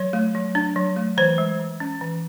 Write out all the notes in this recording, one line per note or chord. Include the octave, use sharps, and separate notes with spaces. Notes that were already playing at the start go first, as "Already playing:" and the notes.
Already playing: F#3 C#5
A3
F#3
D4
F#3
A3
E3 C5
G#3
E3
C#4
E3